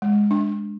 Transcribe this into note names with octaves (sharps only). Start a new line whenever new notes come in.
G#3
D4